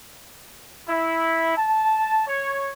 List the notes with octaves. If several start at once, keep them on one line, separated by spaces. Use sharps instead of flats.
E4
A5
C#5